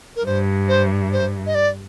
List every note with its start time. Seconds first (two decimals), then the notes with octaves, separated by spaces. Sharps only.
0.16 A#4
0.26 G2 C5
0.68 C5
1.12 C5
1.46 D#5
1.55 D5